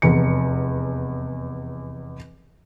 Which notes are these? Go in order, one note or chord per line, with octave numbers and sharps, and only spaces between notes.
F1 E2 C#7